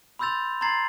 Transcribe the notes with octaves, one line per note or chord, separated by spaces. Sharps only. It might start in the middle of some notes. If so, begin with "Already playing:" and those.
B5 C6 E6 G6 A6 F7
A#5 C6 G#6 A6 C7